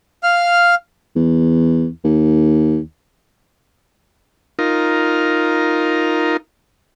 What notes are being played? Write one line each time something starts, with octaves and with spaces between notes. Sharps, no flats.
F5 F6
E2
D#2
D#4 F4 A#4